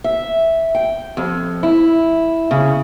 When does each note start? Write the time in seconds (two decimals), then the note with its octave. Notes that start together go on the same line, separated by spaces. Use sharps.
0.04 E5
0.75 G5
1.17 F2
1.63 E4
2.51 C#3